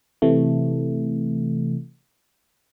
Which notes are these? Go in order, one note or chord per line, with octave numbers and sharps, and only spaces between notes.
C3 E3 A3